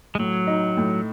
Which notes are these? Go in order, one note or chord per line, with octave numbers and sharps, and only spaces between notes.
G#3
A2 F#3
D#4
A2